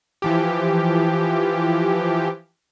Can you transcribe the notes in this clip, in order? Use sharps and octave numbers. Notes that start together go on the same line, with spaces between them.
E3 F3 G4